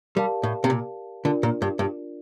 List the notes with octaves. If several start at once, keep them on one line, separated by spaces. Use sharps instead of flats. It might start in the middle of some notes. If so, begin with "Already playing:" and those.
G3 G4 A#4 D5 F5 A5
A2
C3
A#2
D3 D4 F4 A#4 D5
A#2
G2
G2